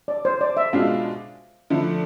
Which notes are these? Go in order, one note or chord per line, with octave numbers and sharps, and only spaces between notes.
D5
C5
D5
E5
B2 G#3 D4 F4 F5
D3 F3 A3 E4